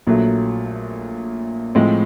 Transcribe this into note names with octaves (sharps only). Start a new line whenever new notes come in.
A#1 A#2 F#3 A3
A2 F3 G#3 C4